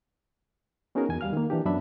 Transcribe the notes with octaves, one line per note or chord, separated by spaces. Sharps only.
B3 C#4 D#4 F#4 G#4 A#4
E2 G#5
G3 F5 F6
D#3 A#3
E3 D4 G4
F#2 F#3 B3 D4 E5 B5